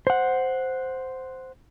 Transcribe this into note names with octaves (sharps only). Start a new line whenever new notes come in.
C5 F#5